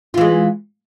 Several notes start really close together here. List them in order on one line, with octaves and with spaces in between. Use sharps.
F4 E3 G#3